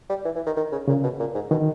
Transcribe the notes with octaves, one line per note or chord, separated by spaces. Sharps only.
G3
E3
E3
D#3
D#3
C#3
A#2 C#3
B2
A#2
G#2
B2 D#3